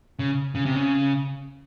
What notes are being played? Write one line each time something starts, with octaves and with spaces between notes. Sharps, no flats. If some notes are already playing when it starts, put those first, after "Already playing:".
C#3
C#3
C3
C#3